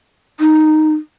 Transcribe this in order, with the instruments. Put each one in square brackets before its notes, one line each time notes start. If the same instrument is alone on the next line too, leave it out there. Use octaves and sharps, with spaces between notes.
[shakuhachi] D#4